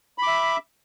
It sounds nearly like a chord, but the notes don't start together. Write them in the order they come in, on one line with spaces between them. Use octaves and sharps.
B5 D6 E5